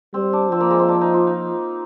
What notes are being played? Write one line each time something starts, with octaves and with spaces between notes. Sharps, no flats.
G3 C4
D4
F3 C4
A#3
G#3
C4
D4
D#4
F4
D#4